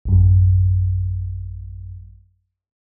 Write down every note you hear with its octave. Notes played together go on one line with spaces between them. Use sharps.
A1 F#2